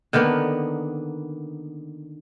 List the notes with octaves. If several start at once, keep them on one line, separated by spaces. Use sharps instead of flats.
D3 D#3 A#3 B3